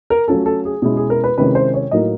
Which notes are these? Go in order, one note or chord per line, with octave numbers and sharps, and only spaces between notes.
A#4
F#3 A3 C#4 F4 A4
A4
G#4
B2 G#3 C#4 E4 G#4
G#4
A#4
B4
C3 D#3 G#3 C#4 E4 B4
C5
C#5
A2 F#3 A#3 D#4 D#5